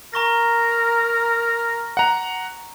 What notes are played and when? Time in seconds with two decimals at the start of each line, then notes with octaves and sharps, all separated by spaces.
0.14 A#4 A#5 C#6 A#6
1.97 F#5 A#5